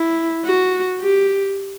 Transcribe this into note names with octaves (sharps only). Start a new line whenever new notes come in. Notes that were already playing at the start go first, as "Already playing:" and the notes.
Already playing: E4
F#4
G4